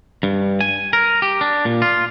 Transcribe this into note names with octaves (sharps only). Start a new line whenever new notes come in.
G2
G#5
A#4
G4
D4
A#2
F4